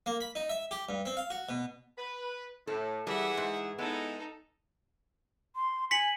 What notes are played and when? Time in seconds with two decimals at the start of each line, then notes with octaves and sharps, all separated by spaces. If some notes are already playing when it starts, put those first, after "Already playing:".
0.06 A#3
0.21 B5
0.35 D#4
0.50 E5
0.71 G4
0.89 G2
1.06 C4
1.17 F5
1.30 F#4
1.49 B2
1.98 B4
2.67 A2 A4
3.07 E3 G3 G#4 E5 F#5
3.37 G#2
3.78 G#3 B3 D#4 E4 A4
5.56 C6
5.91 G#5 B6 C#7 F#7